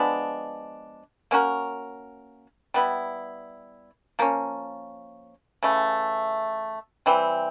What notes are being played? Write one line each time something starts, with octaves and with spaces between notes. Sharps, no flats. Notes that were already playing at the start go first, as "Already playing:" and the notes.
Already playing: F3 G#3 B3 D4
A#3 C#4 F#4 A#4
G3 B3 E4
F3 A#3 C#4
C#3 E3 A3
E3 G3 C4